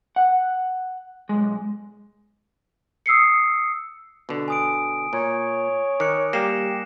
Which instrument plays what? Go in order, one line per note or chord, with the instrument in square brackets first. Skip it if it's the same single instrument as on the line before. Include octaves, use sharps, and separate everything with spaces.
[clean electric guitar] F#5
B1 G#3
[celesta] D#6 E6 C7 C#7
[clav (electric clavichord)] B2 D3
[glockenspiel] G#5 D#6 D7
[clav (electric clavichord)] A#2 [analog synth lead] C#5
[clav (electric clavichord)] D#3 [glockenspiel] D6 F#6 C#7
[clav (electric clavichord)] G3 A#3 [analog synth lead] G4 [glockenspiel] A#6 C7 E7